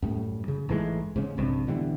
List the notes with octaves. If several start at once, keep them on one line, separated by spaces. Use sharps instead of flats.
F#2 A2 G3
C#3
A1 G#2 E3 G#3
G#2 C#3
A#1 G2 C3
B2 D3 E3 G3